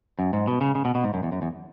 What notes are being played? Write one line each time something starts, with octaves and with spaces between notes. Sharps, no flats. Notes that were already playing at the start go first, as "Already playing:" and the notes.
F#2
G#2
B2
C#3
C#3
B2
B2
G#2
F#2
E2
F#2
E2